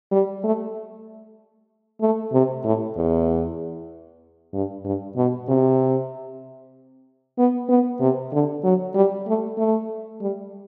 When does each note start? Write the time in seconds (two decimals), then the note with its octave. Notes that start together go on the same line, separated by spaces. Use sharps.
0.12 G3
0.44 A3
2.01 A3
2.33 C3
2.64 A2
2.96 E2
4.54 G2
4.85 G2
5.16 B2
5.48 C3
7.38 B3
7.69 B3
8.01 C3
8.32 D3
8.64 F#3
8.95 G3
9.27 A3
9.58 A3
10.21 G3